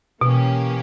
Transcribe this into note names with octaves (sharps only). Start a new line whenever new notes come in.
B2 E3 A#3 C#4 G4